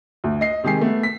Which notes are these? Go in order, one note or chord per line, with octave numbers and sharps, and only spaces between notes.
D2
D#5 C7
C3 D#3 G#3 G4 G#5 C7
A3 B3
B6